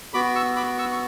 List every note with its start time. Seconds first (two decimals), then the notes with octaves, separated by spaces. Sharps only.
0.14 B3 F#4 B5 D6
0.35 C#6 E6
0.56 B5 D6
0.78 C#6 E6
0.92 C#6